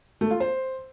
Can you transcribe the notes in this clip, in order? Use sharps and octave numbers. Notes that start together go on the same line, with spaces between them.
A3
F4
C5